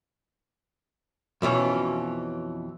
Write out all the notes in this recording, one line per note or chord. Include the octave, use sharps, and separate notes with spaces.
F2 B2 E3 C#4